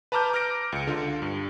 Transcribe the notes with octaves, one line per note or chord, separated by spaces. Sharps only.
B4 A5 A#5 D6 F6 G6
D6 F6 G6 A#6 D7
C#2 C#7
D3 F4
G2